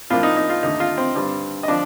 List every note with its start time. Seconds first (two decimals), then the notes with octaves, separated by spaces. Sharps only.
0.10 A2 F3 A#3 D4 F4
0.23 D#4
0.37 D#4
0.50 F4
0.63 D#2 D3 A3 D#4
0.80 F4
0.97 C4 C5
1.15 G2 D3 G3 C4
1.63 D#5
1.68 D3 F3 D4 D5